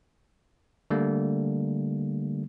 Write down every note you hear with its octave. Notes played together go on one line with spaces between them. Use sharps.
D3 G3 A3 A#3